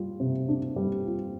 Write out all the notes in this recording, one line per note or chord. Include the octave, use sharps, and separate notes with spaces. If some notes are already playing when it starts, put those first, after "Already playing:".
Already playing: G3 F4
C3
D4
G3
F4